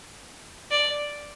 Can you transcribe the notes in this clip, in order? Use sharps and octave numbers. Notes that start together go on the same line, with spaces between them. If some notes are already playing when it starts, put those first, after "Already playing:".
D5